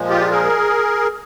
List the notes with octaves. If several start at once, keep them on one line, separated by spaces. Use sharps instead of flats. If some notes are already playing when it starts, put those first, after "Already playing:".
Already playing: A#2 F3 G#3
F4 G4
G#4 A#4